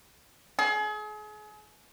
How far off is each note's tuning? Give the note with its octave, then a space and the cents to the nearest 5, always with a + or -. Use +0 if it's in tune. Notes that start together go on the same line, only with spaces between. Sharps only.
G#4 +35